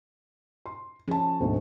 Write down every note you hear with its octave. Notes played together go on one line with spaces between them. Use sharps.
C6
F3 C#4 G#4 A5
D2 G#2 B2